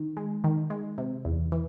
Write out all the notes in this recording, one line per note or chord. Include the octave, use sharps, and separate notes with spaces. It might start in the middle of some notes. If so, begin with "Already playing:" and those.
Already playing: D#3
G#3
D#3
G#3
C3
E2
E3